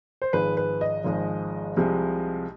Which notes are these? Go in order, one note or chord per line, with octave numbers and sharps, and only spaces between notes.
C5
G#1 G#2 F3 G#3 B4
B4
D#5
G#1 G#2 F3 G#3
C2 C3 F3 G#3